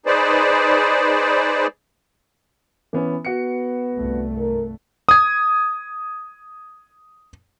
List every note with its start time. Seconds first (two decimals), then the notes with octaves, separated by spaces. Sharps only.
0.06 D#4 G#4 B4 C5 D5
2.93 E3 B3 C#4
3.25 B3 F#4 C#7
3.96 C2 G2 A3
4.39 A#4
5.09 D#6 G#6